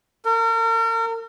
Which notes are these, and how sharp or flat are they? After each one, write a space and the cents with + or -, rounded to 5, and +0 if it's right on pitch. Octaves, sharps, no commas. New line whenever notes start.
A#4 -40